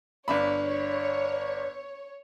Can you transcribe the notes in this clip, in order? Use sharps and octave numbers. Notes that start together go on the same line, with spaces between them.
G1 D4 C#5 B5